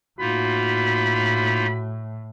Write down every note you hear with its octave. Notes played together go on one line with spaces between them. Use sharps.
A2 A#3 D#4 F4 F#4 B5